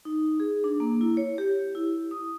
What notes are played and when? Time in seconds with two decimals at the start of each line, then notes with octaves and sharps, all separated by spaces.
0.05 D#4
0.40 G#4
0.64 D4
0.80 A#3
1.01 E4
1.17 C#5
1.38 G4
1.75 E4
2.11 D#6